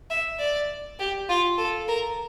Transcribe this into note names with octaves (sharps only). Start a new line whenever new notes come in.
E5
D5
G4
F4
A4
A#4